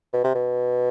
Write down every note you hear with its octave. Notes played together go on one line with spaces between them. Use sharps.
B2
C3
B2